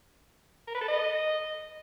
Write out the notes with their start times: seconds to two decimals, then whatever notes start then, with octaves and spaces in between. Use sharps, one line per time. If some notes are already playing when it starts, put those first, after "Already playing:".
0.68 A#4
0.74 B4
0.81 A4
0.88 D#5